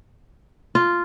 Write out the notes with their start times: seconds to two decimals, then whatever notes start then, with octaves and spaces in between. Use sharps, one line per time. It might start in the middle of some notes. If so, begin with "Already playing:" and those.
0.75 F4